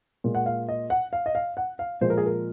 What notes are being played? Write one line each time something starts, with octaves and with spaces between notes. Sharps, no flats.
A#2 G#3
F#5
F5
D#5
F#5
F5
D#5
F5
F#5
F5
A#2 F3 G#3 C5
A#4
G#4
A#4